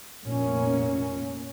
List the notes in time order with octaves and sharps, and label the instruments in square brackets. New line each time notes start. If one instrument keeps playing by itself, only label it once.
[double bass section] F1 A#2 A#3 C#4